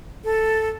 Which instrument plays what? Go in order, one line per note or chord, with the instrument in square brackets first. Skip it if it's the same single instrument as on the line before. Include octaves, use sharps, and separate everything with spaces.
[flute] A4